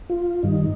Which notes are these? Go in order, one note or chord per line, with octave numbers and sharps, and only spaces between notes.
F4
G2 D#3 G3 D#4